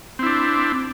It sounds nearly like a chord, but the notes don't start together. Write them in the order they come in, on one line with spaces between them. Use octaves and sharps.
C4 E4 D4